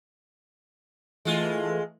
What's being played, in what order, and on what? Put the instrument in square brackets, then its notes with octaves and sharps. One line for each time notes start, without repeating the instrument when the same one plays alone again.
[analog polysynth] E3 A3 [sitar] G#3 F4